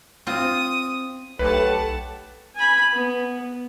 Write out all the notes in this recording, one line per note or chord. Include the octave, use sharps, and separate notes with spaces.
C4 F4 D#6
B1 A3 G4 B4 F#5 A5
G#5 B5
B3